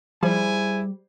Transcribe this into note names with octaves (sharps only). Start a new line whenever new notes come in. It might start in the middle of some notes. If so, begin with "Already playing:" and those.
F3 G3 E4 G#4 C5 G#5